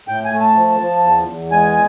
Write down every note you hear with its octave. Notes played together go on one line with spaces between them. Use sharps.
A2 G5
G#5
A3
A5
F3
F3
E2
E2
G#3 G#5